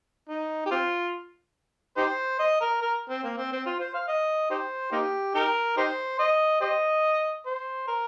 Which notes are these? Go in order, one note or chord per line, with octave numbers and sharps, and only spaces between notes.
D#4
G4
C4 F4
D#4 G4 C5
D#5
A#4
A#4
C4
A#3
C4
C4
F4
C5
F5
D#5
D#4 G4 C5
A#3 D#4 G4
D#4 G4 A#4
D#4 G4 C5
D#5
G4 C5 D#5
C5
A#4